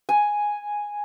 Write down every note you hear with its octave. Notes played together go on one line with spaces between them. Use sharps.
G#5